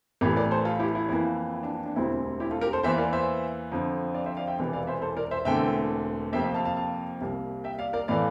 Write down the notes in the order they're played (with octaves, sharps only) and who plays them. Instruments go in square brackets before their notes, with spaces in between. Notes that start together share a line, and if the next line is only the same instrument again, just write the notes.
[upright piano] A1 A2 E3 A3 G4 A#4
A#4 D5
A4 C5
F4 A4
E4 G4
E4
F2 E3 A#3 E4
E4
D4
D4
D4
E1 D2 D3 G3 C4 E4
E4 G4
F4 A4
G4 A#4
A4 C5
E2 E3 A#3 C5 E5
A#4 D5
C5 E5
F2 D3 F3
D5 F5
C5 E5
D5 F5
E5 G5
E1 E2 C3 E3
D5 F5
C5 E5
A4 C5
A#4 D5
C5 E5
E1 E2 D3 A3 C4 E5 G5
F2 C3 F3 A#3 E5 G5
E5 G5
F5 A5
F5 A5
F5 A5
C2 C3 G3 A#3
E5 G5
D5 F5
A#4 D5
A2 E3 A3 D5 F5